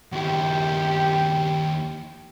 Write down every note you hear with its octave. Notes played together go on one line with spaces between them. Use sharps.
D#2 E4 G4